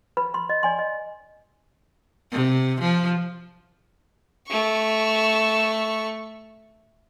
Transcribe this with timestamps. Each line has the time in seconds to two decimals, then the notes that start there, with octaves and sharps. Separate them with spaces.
0.17 B4 B5
0.34 C6
0.49 D#5
0.63 D5 G#5 C6
0.79 D#5
2.32 C3
2.81 F3
4.48 A3 C#6